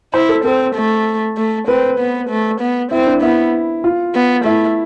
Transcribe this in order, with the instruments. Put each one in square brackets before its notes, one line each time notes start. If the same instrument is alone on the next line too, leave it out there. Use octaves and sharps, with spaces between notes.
[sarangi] E4 [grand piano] C5
[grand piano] A4
[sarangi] C4 [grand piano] A4
[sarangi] A3
A3
[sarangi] C4 [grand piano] B4
[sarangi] B3
A3
B3
[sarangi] C4 [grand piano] E4
[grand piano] D4
[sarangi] B3 [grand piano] E4
[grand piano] F4
[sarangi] B3
[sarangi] A3 [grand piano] E4